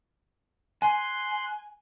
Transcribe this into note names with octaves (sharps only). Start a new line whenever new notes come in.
G#5 C6 F#6